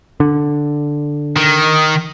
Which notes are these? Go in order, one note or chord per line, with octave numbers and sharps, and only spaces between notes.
D3
D#3